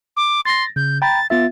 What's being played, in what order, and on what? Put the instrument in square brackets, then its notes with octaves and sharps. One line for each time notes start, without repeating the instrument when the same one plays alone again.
[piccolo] D6
[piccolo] C6 [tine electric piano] A6 A#6
[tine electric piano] C#3 [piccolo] G6
[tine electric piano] G5 A#5 B5 [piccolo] A6
[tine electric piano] B3 F4 E5 [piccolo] A6